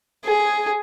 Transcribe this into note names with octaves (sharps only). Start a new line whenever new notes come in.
G#4